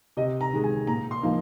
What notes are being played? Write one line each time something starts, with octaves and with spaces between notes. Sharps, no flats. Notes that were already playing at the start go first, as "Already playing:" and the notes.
C3 D#5
A#5
D#3 G#3
G#5
A#2 A#5
C6
F3 A#3 D#4